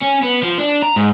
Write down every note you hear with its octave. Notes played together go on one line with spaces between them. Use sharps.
C#4
B3
F3
D4
A#5
G#2